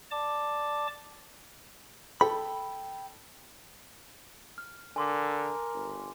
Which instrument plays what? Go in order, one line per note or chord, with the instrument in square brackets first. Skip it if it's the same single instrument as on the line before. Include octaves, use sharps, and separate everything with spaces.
[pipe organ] D5 A5 D6
[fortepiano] A4 [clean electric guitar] G5 B5
[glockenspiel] F6
[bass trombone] D3 [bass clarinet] A#4 [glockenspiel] G#5 C6 D6
[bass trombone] G1